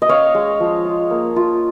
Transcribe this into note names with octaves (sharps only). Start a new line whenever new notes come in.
D#5
C#4 C#5 F5
G#3
F3
F4
A#3
F4